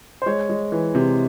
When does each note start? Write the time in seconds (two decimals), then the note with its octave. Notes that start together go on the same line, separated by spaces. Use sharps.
0.22 C5
0.26 G#3 C#5
0.50 G#3
0.72 E3
0.95 C3